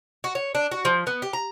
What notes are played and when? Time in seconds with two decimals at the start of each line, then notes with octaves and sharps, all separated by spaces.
0.24 F#4
0.35 C#5
0.55 D4
0.71 F#4
0.85 F3
1.07 B3
1.22 G4
1.33 A#5